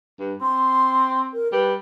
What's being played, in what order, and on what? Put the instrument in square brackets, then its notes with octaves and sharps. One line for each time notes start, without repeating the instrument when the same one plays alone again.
[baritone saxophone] G2
[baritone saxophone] C4 [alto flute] C6
[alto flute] A#4
[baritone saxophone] G3 [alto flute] B4